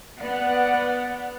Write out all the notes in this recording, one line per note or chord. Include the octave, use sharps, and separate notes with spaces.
B3 D5 F#5